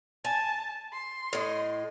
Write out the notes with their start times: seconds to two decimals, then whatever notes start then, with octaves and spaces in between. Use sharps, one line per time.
0.25 G#5 A5
0.93 C6
1.33 A2 D#5